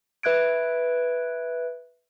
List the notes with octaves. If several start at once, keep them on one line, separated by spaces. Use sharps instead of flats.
B4 E5 F#6 G#6 D7